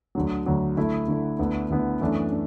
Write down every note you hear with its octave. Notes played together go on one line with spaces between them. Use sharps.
D2 D3 F#3
D2 D3 F#3
D3 A3 E4
D3 A3 E4
D2 D3 B3 E4
D2 D3 B3 E4
F#2 E3 A3 D4
D4